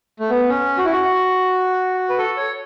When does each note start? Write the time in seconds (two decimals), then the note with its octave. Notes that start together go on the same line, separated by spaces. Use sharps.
0.20 A3
0.30 B3
0.49 C#4
0.78 F#4
0.85 E4
0.93 F#4
2.09 B4
2.18 A4
2.37 C#5